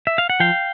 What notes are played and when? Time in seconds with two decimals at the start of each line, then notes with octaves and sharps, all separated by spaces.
0.07 E5
0.18 F5
0.30 F#5
0.40 F3 F5 G5